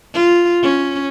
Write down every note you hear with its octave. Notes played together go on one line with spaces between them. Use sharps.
F4
C#4